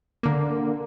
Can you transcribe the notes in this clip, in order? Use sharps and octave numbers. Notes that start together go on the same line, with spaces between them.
D3 A#3